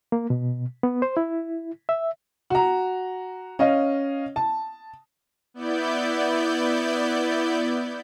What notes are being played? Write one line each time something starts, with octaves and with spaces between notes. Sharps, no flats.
A#3
B2
B3
C5
E4
E5
F#4 A#5
C#4 D#5 F5
A5
B3 E4 D5 G6